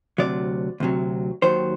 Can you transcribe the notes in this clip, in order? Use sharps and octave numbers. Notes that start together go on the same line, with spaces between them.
D2 C3 F#3 D5
D2 C3 F#3
D#2 D#3 F#3 C5